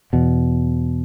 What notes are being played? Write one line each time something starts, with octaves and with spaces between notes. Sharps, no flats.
E2 B2